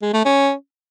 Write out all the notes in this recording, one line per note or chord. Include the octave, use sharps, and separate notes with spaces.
G#3
A3
C#4